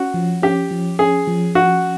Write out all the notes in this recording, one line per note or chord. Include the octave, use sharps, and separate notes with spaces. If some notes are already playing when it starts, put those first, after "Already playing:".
Already playing: C#4 F#4
F3
C#4 G4
F3
C#4 G#4
F3
F3 F#4